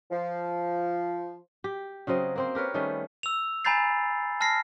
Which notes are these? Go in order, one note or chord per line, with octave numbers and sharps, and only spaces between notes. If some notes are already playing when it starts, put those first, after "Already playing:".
F3
G4
C#3 F#3 C4 D#5
A#3 C4 C5
G4 A#4 B4 C#5
D#3 G3 A3 C#4
E6 F7
G#5 A#5 B5 G6 A6 C7
A5 F6 A#6 C7